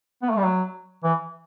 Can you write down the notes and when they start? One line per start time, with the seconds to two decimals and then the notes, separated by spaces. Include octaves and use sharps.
0.22 B3
0.30 A3
0.37 G3
0.45 F#3
1.04 E3